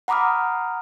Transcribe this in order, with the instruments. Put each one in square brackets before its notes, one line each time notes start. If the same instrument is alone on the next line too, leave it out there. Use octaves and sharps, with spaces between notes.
[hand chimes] F#5 A#5 B5 D6 D#6 F6